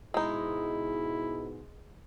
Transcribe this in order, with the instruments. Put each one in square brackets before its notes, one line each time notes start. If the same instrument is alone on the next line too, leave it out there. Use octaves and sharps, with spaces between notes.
[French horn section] G#2 B2 G#4 [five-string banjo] G#3 D#4 [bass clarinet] E4